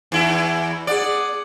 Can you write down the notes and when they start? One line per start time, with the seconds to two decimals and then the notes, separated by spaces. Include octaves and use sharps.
0.12 E2 E4
0.87 G#4 D5 F#5